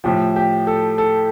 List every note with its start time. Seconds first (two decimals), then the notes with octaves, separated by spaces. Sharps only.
0.04 A2 F3 G4
0.36 G4
0.67 A4
0.98 A4